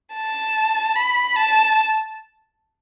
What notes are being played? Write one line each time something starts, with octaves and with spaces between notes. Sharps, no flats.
A5
B5
A5